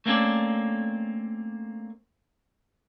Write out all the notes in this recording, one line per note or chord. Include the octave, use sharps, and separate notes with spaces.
A3 A#3 C4 C#4 A4 D5